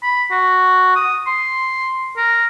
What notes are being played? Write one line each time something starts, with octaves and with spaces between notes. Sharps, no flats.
B5
F#4
D#6
C6
A#4